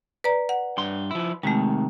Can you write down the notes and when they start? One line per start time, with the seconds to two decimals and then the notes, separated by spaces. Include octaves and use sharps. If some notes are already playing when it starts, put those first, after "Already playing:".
0.24 B4 D5 A#5
0.49 F#5
0.78 G2 C6
1.11 F3 E4
1.43 C3 D#3 G#3 A3